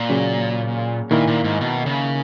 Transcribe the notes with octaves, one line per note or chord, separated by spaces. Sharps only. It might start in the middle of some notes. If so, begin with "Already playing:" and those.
Already playing: A#2
C#3 F#3 A#3 C#4
A#2 D#3 A#3 E4 A#4
A#2
G#2
B2
C#3